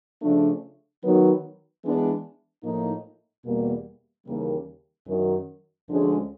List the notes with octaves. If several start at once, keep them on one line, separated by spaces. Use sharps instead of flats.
C#3 F3 A3 D4
D#3 F#3 B3
E3 G#3 B3 D4
A2 F3 A#3 D#4
E2 B2 G3 A#3
D#2 C#3 E3 G3 A#3
F#2 D#3 F#3
D2 D3 F3 G#3 C#4